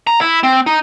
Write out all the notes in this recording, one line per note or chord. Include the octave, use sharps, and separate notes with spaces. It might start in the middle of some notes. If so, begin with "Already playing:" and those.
A#5
E4
C4
D#4